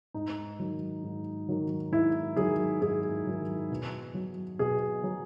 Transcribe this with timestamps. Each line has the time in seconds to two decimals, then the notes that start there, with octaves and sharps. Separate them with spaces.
0.14 G#2 D#4
0.59 D#3 F#3
1.04 G#2
1.49 D#3 F#3
1.92 G#2 E4
2.37 D#3 F#3 G#4
2.82 G#2 G#4
3.27 D#3 F#3
3.70 B2
4.14 F#3
4.59 B2 G#4
5.04 F#3